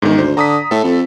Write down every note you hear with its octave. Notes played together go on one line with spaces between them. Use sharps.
E1 G#2 D#3
D2 C5
D3 A#5 D#6 B6
A2 A4
F2